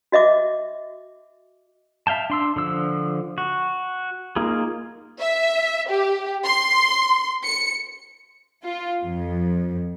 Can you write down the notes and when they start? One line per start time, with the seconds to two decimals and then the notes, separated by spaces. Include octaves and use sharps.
0.12 F#4 D#5 E5 D6
2.07 E5 F5 G5 A5
2.30 D4 C6 E6
2.56 D3 F3 E6
3.38 F#4
4.36 A#3 D#4 F4 G#4
5.19 E5
5.89 G4
6.44 C6
7.44 C#7
8.64 F4
9.03 F2